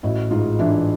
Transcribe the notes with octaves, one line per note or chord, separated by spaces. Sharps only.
A1 E4 F#4
G#2 D#4 F4
E3 D4 E4